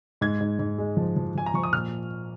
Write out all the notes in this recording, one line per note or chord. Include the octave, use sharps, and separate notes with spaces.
G#2 G#6
G#2
G#2
G#3
F3
F3
F3 G#5
A#5
F3 C#6
D#6
A#2 F6